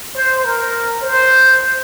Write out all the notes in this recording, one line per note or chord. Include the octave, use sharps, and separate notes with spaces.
C5
A#4
C5